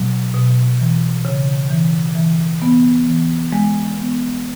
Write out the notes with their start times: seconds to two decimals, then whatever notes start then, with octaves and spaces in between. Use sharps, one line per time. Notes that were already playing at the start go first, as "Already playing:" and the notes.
Already playing: B2 F#3
0.34 B2
0.79 E3
1.25 C#3
1.71 E3
2.15 E3
2.62 B3
3.07 E3
3.52 G#3
3.98 B3